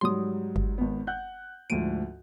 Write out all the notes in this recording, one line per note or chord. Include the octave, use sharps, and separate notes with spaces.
G#2 F#3 G3 C6 D#6
G1
G#1 B3
F#5 F#6 G6
D2 G#2 F3 D7 D#7